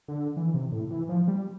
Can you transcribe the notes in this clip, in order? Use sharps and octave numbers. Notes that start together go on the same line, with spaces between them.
D3
E3
C3
A2
E3
F3
G3